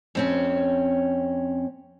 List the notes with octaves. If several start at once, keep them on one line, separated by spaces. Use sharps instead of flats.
F2 C4 C#4